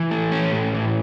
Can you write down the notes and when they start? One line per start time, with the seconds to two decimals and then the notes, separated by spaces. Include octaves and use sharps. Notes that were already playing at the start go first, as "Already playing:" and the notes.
Already playing: E3
0.11 A3
0.32 C#4
0.52 A2
0.74 E3